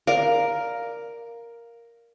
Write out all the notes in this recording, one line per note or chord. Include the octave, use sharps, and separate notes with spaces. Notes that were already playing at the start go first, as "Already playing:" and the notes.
A#4 D5 F5